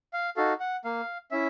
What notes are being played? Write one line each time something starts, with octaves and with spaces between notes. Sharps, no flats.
F5
D#4 F#4 A4 F5
F#5
A#3 F5
C#4 E4 E5